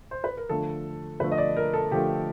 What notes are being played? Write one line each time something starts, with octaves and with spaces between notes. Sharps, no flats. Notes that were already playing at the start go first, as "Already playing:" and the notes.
C5
B4
A#4
D3 F3 A3 A4
D3 F3 A3 B4
D#5
D5
A#4
A4
D3 F3 A3 G4